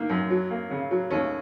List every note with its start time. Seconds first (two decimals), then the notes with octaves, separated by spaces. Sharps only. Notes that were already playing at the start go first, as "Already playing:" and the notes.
Already playing: D#3 A#3
0.09 F#2
0.30 F#3
0.50 A#3
0.71 C#3
0.91 F#3
1.10 D#2 C#4